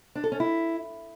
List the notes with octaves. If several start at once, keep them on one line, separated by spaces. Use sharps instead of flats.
D4
A4
C#4
E4